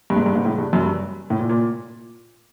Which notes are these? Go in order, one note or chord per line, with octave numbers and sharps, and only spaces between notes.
G2
G#2
G2
G#2
A2
G2
F#2
G2
A2
A#2
A#2